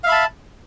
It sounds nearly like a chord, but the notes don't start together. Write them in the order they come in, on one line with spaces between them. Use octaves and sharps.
F5 E5 B5 A5